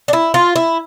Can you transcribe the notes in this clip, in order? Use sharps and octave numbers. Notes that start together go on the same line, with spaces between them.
D4
E4
F4
E4